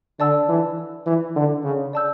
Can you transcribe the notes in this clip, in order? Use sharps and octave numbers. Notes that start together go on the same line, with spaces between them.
D3 D5 A5 E6
E3
E3
D3
C#3
D5 A5 E6 G6